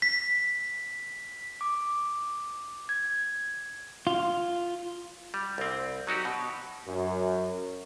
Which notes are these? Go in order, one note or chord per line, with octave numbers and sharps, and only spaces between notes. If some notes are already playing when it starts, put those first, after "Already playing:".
B6
D6
G#6
F4
G3
C2 C4
F#3 D#4 F#4 G4
B2
F#2